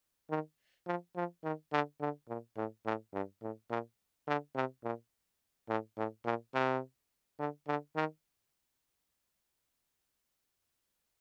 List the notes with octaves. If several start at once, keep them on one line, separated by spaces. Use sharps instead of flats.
D#3
F3
F3
D#3
D3
D3
A#2
A2
A2
G2
A2
A#2
D3
C3
A#2
A2
A2
A#2
C3
D3
D3
D#3